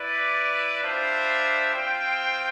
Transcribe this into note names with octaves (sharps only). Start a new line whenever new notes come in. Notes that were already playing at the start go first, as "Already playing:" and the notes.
Already playing: E4 B4 D5
G3 D4 F4 C5 E5
C4 F4 C5 G5